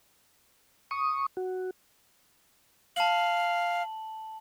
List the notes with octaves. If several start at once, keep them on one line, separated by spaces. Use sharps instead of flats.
C#6 D#6
F#4
F5 A5 F#7